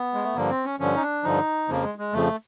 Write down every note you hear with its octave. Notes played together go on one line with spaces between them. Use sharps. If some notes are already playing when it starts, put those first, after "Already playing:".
Already playing: B3
G#3
A3
G2 D3 F3 A#3
C4
C#4
G2 D3 F3 C#4
D#4
D4
G2 D3 F3 D#4
F2 C#3 F3 A#3
G#3
G#3
F2 C#3 F3 A3